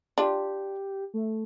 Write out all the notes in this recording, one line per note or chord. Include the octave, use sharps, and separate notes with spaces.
D4 F4 G4
A3